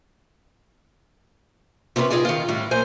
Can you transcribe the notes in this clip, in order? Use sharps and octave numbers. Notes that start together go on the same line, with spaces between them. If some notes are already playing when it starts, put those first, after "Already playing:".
C3 C4 C#4 A#4 B4
D#4 F4 G#4 D5
D#3 F4
A2 G3
A#2 F#3 C5 G#5